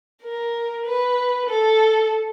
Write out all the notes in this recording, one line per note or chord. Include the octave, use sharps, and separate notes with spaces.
A#4
B4
A4